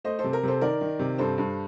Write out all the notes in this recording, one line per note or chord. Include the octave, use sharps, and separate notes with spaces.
A3 C5 D#5
A4 C5
C3
A#4
C3 A4 C5
D#3 A#4 D5
D#3
C3
G2 A4 C5
G2